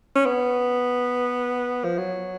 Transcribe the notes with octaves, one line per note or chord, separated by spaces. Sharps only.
C#4
B3
F3
F#3